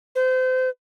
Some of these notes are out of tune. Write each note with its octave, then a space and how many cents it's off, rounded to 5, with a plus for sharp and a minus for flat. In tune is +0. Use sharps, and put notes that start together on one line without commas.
C5 -30